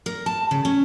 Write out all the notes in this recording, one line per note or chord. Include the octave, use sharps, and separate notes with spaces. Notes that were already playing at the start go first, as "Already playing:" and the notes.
A#4
A5
C#3
C#4